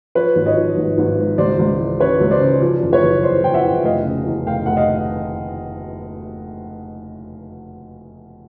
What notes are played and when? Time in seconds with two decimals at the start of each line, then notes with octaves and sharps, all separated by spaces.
0.15 F3 B4 C#5
0.36 G#1
0.46 C#5 D#5
0.57 F3
0.77 G#1
0.98 G#1
1.18 G#2
1.38 C#2 C5 D5
1.59 C#2
1.79 E3
2.00 C#3 B4 C#5
2.20 C#2
2.31 C5 D5
2.41 C#3
2.62 F3
2.82 F#1
2.92 B4 C#5
3.03 F#1
3.23 E2 C5 D5
3.43 F3 G5
3.54 E5 F#5
3.64 E2
3.84 F1 D#5 F5
4.05 C#3
4.26 E2
4.46 F1 F5 G5
4.66 F1 F#5
4.77 D#5 F5